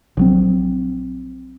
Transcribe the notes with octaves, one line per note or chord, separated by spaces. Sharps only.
A#1 F#3 C4